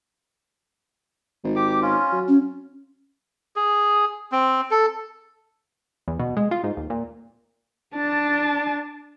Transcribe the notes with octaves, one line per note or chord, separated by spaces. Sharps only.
G#1
G4 D6
C#4 F4
F#3
C#4
G#4
C4
A4
E2
B2
G#3
F4
G#2
D#2
A#2
D4 A5